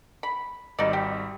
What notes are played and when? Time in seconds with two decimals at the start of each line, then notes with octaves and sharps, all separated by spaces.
0.23 B5
0.79 G#1 G3 D#4 D5
0.93 G4